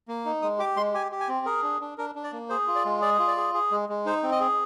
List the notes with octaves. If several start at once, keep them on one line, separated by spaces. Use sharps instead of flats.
A#3
D#4
G#3 D#6
G4 D6
G#3 C6
G4 G#5
G4
G#5
C4
G#4 A#4
D4
D4
D4 A#4
D4
D5
A#3
G#4 C5
F4
D5
G#3
G#4 D5
F4
D5
G#4
G#4
G#3
G#3
D#4 C5
C4
D#5
G#4